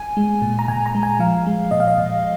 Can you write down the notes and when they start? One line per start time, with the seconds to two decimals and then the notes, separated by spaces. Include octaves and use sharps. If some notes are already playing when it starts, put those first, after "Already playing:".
Already playing: G#5
0.17 G#3
0.42 A#2
0.59 A#5
0.68 A#2 G#5
0.86 A#5
0.95 G#3
1.03 G#5
1.19 F3 F5
1.46 G#3
1.71 A#2 D#5
1.80 F5
1.88 D#5
1.98 A#2